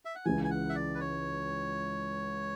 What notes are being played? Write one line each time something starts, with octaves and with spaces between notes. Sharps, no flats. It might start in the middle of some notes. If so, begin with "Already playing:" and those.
E5
F#5
C#2 C#3 E3 G#5
G#5
F#5
E5
D5
B4
C#5